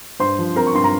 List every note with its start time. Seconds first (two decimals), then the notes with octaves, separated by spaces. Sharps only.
0.20 G2 C5 C6
0.39 F3
0.56 C4 A#4 A#5
0.67 C#6
0.74 G2 C6
0.84 A#5